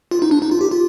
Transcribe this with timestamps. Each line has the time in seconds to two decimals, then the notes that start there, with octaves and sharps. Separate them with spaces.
0.11 F4
0.22 D#4
0.31 D4
0.42 D#4
0.51 F4
0.61 G4
0.71 F4